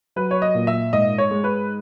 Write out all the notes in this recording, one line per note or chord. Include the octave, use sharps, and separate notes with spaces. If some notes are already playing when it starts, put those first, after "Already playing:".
F#3 B4
C#5
D#5
A#2
E5
G#2 D#5
C#5
G#3
B4